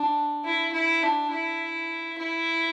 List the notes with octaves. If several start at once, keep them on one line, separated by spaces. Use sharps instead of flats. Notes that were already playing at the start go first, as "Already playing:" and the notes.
Already playing: D4
E4
E4
D4
E4
E4